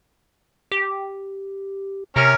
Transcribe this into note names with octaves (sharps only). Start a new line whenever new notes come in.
G4
C3 C#4 A#4 F6